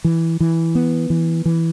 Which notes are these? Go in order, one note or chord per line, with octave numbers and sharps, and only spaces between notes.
E3
E3
B3
E3
E3